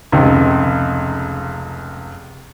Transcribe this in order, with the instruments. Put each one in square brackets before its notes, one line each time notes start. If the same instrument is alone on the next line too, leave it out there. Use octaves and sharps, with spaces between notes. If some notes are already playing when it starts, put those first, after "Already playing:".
[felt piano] F1 C#2